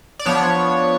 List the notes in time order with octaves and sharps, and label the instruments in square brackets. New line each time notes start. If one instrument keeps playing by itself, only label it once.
[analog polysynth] D5
F3 B3 D4 C#5